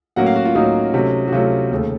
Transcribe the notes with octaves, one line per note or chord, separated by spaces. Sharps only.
A2 F#3 A#3 C#4 F#5
F5
F#4
F4
A2 F#3 A#3 C#4 D#4
C3 F#3 A3 C#4
F#4
C3 F#3 A3 C#4 F4
D#2 C#3 A3